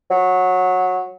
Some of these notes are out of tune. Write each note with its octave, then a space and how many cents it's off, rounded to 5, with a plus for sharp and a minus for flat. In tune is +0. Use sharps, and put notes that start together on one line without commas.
F#3 -15